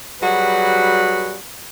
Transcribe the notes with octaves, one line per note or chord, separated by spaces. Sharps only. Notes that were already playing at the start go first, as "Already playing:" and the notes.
F#3 G3 F#4 G#4 B4